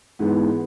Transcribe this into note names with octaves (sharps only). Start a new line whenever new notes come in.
G#2 E3 G#3 B3